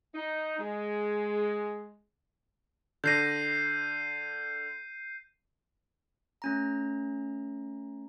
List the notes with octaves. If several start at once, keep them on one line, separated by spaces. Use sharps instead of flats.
D#4
G#3
D3 G6 A#6 C7 D#7
A3 C#4 A#5